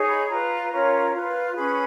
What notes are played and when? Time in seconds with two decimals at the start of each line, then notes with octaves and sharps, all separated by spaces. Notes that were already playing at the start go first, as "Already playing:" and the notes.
Already playing: D#4 G#4 C#5
0.08 B5
0.29 F4 B4 A#5
0.71 C#4 F4 A#4 C#5
1.13 F4 B4
1.54 C#4 G#4 B4 B5